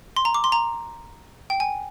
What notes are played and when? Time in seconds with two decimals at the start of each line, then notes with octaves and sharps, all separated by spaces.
0.16 C6
0.25 A#5
0.34 D6
0.44 C6
0.52 A#5
1.50 G5
1.60 G#5